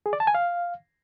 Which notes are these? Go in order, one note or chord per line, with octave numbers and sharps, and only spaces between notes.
G#4
D5
A5
G#5
F5